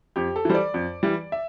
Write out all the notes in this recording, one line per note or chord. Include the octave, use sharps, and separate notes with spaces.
F2 G4
A4
E3 G3 C5
D5
F2
E3 G3
E5